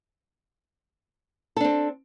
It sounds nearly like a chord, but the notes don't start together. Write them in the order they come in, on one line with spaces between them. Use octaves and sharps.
A4 D4 C4